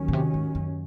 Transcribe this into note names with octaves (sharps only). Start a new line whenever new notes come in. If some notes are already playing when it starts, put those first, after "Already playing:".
Already playing: D#2 D#3 F#3 C#4
A#2
C3
G#2
F#2